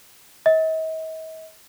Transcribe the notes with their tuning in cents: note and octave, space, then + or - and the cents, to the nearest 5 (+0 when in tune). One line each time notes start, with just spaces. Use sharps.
D#5 +45